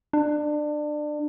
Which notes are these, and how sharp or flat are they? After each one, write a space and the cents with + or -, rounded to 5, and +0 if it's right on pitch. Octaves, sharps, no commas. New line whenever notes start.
D4 +25